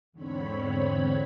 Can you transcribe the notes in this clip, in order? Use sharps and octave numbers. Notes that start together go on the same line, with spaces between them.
E2 G#2 D3 C4 C#5 B5